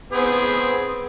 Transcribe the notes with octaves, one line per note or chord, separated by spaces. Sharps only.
B3 C4 G#4 G#5